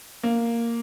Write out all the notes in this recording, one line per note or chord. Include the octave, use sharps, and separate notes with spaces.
A#3